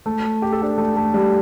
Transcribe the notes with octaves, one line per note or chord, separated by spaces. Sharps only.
A3
G4
A4
D4 G4
A3
A3
G3